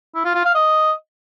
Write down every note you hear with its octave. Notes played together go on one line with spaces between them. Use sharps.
E4
F4
F4
F5
D#5